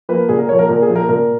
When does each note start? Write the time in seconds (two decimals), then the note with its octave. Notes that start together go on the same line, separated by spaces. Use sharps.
0.09 F3 A#3 B4
0.29 A#2 G#4
0.39 A#4
0.48 A#3 C#5
0.52 F3
0.59 A#4
0.69 A#2 A#4
0.82 G#4
0.89 F3 A#3
0.96 A#4
1.09 A#2 A#4